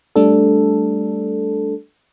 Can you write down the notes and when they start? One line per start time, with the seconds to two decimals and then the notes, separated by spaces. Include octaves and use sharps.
0.16 G3 A3 D4 A4